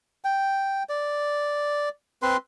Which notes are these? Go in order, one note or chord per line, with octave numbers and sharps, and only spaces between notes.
G5
D5
C4 B4 C6